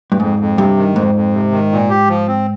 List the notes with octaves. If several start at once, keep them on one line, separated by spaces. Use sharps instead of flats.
G2
F2 G#2
F2
G2 C3
D#3
F2 G#2
F2
C3
D#3
A#2
G4
F3
C4